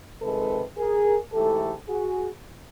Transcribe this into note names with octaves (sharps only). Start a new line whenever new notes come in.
F2 C3 D#3 G#3 A4 B4
G#4 A#4
G#2 E3 A3 G4 A4
F#4 G#4